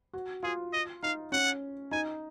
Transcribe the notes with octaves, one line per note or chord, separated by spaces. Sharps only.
F#4
F4 G#4
D#5
D#4 F5
C#4 F#5
D#4 G#5